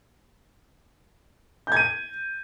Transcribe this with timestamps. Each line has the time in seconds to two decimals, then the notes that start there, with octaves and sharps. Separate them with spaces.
1.67 G6
1.72 G#6
1.77 D#7